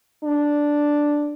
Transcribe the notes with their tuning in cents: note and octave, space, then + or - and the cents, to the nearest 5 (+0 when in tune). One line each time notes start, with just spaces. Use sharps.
D4 +0